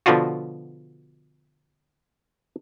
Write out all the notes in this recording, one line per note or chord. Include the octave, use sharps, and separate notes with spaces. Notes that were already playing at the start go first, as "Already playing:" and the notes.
B2 D3 F3 D4 F4 F#4